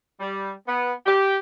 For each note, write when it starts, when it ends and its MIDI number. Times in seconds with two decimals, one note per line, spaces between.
0.20 0.51 55
0.67 0.91 59
1.06 1.37 67